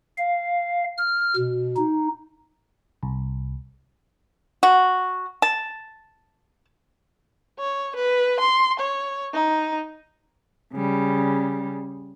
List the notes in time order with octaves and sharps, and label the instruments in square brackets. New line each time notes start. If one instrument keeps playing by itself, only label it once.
[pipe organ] F5
F6
B2
D#4
[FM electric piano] C2
[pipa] F#4
A5
[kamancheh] C#5
B4
C6
C#5
D#4
[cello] C#3 G3